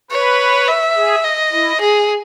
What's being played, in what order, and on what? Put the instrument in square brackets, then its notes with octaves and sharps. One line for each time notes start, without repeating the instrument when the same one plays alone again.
[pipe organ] B4 [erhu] C#5
[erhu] E5
[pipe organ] G#4
[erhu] D#5
[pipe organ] E4
[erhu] G#4